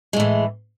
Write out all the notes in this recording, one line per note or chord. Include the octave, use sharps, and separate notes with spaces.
A2 E3 G#3